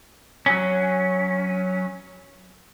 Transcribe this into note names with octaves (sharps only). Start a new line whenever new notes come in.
F#3 C#4